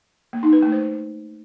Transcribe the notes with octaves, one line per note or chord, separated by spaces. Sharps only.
A#3
D#4
B4
A3
C5